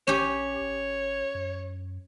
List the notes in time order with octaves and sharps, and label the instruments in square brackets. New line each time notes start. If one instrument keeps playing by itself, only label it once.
[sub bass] A#1 [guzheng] C#4 G4 [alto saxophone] C#5
[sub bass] G#1
F#2